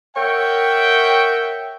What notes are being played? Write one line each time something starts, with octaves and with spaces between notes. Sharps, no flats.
A#4 C#5 E5 F#5 G5